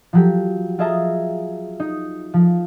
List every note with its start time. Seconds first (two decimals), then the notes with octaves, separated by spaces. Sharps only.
0.13 F3 F#3 G4
0.79 F4 G#4 D#5 E5 A5 A#5
1.80 D#4
2.34 F3